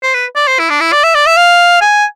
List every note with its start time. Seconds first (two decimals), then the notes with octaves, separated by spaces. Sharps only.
0.02 C5
0.14 B4
0.36 D5
0.48 C5
0.59 E4
0.70 D4
0.81 E4
0.92 D5
1.03 E5
1.15 D5
1.26 E5
1.37 F5
1.81 G#5